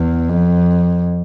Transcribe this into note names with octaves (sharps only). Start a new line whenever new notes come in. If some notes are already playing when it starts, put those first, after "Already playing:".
Already playing: E2
F2